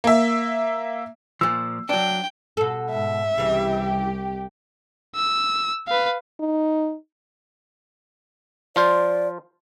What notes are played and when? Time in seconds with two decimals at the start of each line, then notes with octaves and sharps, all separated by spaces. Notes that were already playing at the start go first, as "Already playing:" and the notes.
0.04 A#3 E5
1.41 A#2 F3 E6
1.89 F#3 D4 G5
2.57 B2 A4
2.90 G#2 E5
3.38 C2 C#3 E3 G4
5.15 E6
5.88 B4 F5
6.40 D#4
8.76 F3 F4 C5 D5